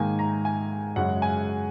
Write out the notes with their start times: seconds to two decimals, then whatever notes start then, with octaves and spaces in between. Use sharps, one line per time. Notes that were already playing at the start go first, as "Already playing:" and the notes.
Already playing: G#2 D#3 A#3 G#5
0.19 A#5
0.45 G#5
0.96 F#2 C#3 G#3 F#5
1.22 G#5